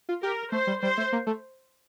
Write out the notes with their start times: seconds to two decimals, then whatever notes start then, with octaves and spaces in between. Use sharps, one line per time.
0.09 F4
0.23 G4 A#4
0.52 A3 C5
0.67 G3
0.82 G3 C5
0.97 A3
1.12 A#3
1.27 A3